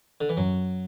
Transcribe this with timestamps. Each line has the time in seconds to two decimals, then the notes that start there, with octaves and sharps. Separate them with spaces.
0.21 D3
0.29 E3
0.37 F#2 F#3